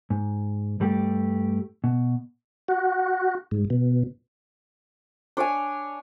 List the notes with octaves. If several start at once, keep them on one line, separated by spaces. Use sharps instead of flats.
G#2
G2 G3 A3 G4
B2
F#4
G#2
B2
D4 C#5 D5 G#5